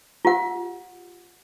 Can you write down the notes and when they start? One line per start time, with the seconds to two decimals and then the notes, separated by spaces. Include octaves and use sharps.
0.25 F4 G4 F#5